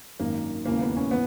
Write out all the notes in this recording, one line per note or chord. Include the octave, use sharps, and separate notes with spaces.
G#1 F#2 D#3 A#3
E1 D#2 C#3 E3 A#3
B3
C#4
E3 B3